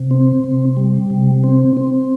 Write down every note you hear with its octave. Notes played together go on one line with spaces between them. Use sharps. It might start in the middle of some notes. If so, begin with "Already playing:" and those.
Already playing: C3
C4
C3
G3
C3
C4
C4